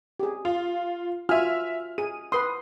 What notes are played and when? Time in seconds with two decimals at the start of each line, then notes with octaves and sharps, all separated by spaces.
0.20 G4 G#4
0.45 F4
1.29 F4 F#4 E5 G#5 F6
1.98 G#4 D#7
2.32 B4 C6 D#6